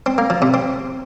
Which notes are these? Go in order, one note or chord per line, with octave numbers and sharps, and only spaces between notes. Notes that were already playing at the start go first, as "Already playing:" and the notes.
C4
A#3
F3
C3
C4